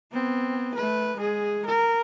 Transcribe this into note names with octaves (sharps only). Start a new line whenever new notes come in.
B3 C4
A3 B4
G#3 G#4
A#4